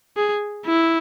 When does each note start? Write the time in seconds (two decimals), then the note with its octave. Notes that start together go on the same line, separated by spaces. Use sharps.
0.17 G#4
0.66 E4